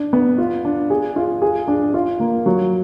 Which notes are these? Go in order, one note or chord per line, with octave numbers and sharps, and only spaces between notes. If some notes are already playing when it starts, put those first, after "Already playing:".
Already playing: D4
B3
F4
D4
G#4
F4
G#4
D4
F4
A#3
F#3